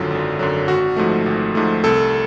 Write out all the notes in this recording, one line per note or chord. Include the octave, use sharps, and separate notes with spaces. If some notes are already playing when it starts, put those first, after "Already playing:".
Already playing: G#1 F#2 D3 F#3 F4
G#1
F#2 D3 F#3
G#1 F#4
G#2 F3 A3
G#1
G#2 F3 A3
C2 A4